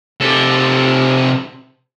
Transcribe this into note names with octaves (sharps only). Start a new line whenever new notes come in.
C3 A4